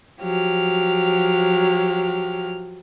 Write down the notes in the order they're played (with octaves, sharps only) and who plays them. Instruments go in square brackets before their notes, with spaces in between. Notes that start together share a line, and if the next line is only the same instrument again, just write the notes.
[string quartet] F3 F#3 G4 F6